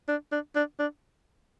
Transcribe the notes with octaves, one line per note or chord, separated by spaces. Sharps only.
D4
D4
D4
D4